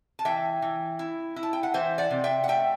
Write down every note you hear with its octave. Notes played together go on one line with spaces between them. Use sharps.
A5
E3 E5 G5
E3
E4
E4
A5
G5
F#5
E3 C5 E5
D5 F#5
C3
E5 G5
F#5
A3 E5 G5